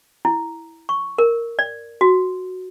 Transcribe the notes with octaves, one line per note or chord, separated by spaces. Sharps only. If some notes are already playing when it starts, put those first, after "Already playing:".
E4
C#6
A#4
D5
F#4